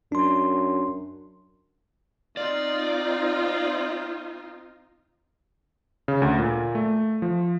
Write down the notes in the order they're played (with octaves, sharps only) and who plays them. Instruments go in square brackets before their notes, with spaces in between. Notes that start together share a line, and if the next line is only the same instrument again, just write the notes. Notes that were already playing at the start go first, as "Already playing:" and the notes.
[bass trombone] F#2 [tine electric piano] D4 C6
[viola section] C4 D#4 F4 [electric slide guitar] D5
[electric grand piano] C#3
D2
A#2
A3
F3